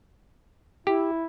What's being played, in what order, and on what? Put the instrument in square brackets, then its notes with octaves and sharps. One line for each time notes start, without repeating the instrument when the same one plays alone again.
[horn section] E4 [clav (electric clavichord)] G4